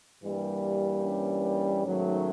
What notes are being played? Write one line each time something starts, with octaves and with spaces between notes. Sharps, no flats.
G2 E3 G3 A#3
C#4
G#2 D#3 F#3 A3